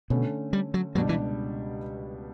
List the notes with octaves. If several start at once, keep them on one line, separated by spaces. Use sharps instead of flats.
B2 D3 A3 C#4
G3
F#3
C#2 B2 F#3 G3 D4 G4
E3